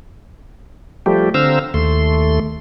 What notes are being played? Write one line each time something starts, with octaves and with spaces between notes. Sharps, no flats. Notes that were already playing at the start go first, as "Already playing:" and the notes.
F3 G3 A3 G4
D3 C4 C5 F5 A#5 E6
D#2 A3 C6